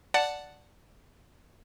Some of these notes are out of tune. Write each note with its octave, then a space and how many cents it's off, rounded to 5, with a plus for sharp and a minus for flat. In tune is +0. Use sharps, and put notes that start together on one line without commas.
D5 +0 F#5 +0 A5 +0